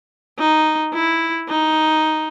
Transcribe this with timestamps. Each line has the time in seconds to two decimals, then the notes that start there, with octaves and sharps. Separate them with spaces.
0.39 D#4
0.94 E4
1.50 D#4